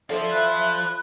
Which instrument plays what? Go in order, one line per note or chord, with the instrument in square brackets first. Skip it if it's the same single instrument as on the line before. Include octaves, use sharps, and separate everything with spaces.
[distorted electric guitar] F4 C5 [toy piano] A4 D5 [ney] E5
[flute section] B5 F#6